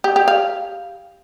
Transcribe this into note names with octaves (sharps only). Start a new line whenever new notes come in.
G4
G4
F5